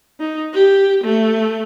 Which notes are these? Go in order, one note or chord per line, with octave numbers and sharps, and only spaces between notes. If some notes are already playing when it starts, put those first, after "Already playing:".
D#4
G4
A3